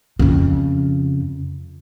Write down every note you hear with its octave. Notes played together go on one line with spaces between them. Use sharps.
F2 C#3